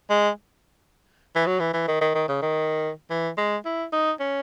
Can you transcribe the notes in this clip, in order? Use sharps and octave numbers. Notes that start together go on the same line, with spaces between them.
G#3
E3
F#3
E3
E3
D#3
D#3
D#3
C#3
D#3
E3
G#3
E4
D#4
C#4